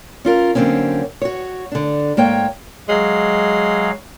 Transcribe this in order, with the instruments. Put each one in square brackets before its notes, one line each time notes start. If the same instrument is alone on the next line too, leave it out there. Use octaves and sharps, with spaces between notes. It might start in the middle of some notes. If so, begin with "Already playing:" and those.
[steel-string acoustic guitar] C#4 F4 A#4
D3 F#3 A#3 C4 C#4
F#4 C#5
D3 D4
G#2 A#3 C#5 G5
[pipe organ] F#3 F5 [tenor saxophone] G#3